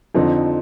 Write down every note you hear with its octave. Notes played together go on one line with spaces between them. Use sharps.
F2 D3 F3 C4 D#4